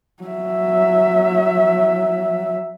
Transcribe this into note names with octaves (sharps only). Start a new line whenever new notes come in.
F#3 E5